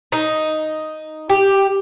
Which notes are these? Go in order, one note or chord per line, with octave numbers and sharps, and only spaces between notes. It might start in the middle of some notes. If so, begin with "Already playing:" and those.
D#4
G4